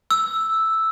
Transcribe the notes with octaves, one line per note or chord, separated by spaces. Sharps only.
E6